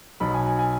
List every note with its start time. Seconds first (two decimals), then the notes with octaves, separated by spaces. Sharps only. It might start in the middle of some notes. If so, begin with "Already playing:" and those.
0.20 B1 B2 F#3 B5
0.34 G#5
0.46 G#5
0.59 G#5